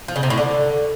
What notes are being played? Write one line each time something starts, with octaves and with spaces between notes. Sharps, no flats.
F3
C#3
C3
A2
D3